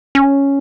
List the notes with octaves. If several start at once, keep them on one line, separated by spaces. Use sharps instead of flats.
C#4